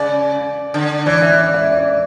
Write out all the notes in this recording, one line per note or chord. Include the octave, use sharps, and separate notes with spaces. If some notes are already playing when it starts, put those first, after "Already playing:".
Already playing: C#3 D5
D3
E3 D5
E5
D5
E5
D5